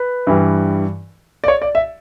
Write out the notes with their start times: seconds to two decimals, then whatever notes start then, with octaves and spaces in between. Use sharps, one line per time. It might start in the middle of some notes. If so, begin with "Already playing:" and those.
Already playing: B4
0.27 G2 E3 G3
1.44 D5
1.48 C#5
1.62 D5
1.75 E5